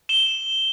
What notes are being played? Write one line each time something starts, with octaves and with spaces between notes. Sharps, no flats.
E7 G7